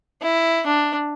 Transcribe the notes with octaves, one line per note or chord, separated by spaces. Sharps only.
E4
D4